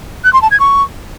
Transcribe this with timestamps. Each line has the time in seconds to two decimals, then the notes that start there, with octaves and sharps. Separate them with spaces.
0.24 F#6
0.33 C6
0.42 A5
0.51 G#6
0.60 C#6